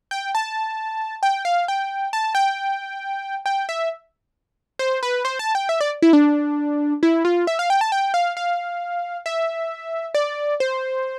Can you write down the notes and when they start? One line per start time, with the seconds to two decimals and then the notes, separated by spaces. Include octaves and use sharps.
0.11 G5
0.35 A5
1.23 G5
1.45 F5
1.68 G5
2.13 A5
2.35 G5
3.46 G5
3.69 E5
4.79 C5
5.03 B4
5.25 C5
5.39 A5
5.55 G5
5.69 E5
5.81 D5
6.02 E4
6.13 D4
7.03 E4
7.25 F4
7.47 E5
7.59 F5
7.70 G5
7.81 A5
7.92 G5
8.14 F5
8.37 F5
9.26 E5
10.14 D5
10.60 C5